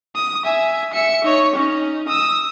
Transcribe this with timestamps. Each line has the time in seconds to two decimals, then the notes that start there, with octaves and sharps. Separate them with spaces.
0.15 D#6
0.44 E5 G#5
0.93 E5 C#7
1.24 D#4 C#5
1.55 C#4 D#4
2.07 D#6 E6